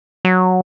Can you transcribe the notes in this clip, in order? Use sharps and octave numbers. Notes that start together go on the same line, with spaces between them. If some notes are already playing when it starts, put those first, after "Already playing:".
F#3